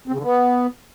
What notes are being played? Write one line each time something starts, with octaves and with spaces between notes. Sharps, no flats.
C4
C#3
D3
B3